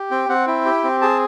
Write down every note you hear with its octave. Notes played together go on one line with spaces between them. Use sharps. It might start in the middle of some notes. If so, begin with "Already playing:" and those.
Already playing: G4
C4 G5
C4 F#5
E4 G5
G4
C4
G#4 A5